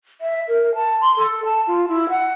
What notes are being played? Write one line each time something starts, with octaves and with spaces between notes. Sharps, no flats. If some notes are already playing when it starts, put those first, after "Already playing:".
E5
A#4
A5
C6
A4
A5
F4
E4
F#5